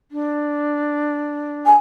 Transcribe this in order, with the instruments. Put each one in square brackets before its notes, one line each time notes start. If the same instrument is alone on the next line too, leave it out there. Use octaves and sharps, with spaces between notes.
[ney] D4
[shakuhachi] G#5